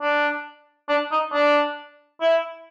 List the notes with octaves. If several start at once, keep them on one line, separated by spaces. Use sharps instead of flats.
D4
D4
D#4
D4
E4